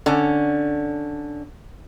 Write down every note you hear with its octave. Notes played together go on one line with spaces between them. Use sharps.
D3 C#4